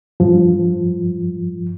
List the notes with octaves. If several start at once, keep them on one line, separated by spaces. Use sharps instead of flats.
G2 F3